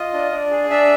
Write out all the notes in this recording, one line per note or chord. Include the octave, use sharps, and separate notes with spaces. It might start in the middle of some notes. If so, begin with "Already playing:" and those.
Already playing: F4 D#5
D4
D4
G#4
D4 E5